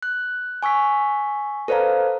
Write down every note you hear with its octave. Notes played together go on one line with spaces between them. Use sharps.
F#6
G#5 C#6 E6 B6
A4 B4 C5 D5 F5 A#5